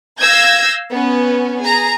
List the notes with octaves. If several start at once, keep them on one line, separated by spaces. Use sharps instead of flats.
F5 E6 G6 G#6 A#6
B3 C#4
G#4 A#5